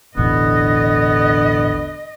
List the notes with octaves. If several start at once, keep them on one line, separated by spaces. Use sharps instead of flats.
E1 A1 D3 B3 D#5